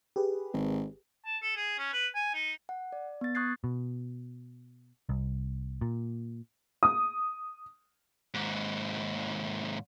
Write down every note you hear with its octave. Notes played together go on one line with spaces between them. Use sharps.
G4 G#4 B4
G#1
A5
A4
G#4
C#4
B4
G#5
D#4
F#5
D5
B3 A6
C#6 D#6 F#6 G#6 A6 C7
B2
C2
A#2
D#6
D#2 G#2